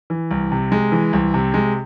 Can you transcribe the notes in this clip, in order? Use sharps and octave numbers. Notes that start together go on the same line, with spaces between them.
E3
C2
C3
G#3
E3
C2
C3
G#3